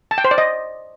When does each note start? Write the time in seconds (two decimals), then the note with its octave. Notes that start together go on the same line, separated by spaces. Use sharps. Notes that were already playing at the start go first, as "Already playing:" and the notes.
0.11 A5
0.18 G5
0.24 C5
0.31 D5
0.38 D#5